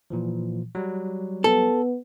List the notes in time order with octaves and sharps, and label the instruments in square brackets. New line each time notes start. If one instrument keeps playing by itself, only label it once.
[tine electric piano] A#2 E3 F3
F#3 G3
[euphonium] B3 [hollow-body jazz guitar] A4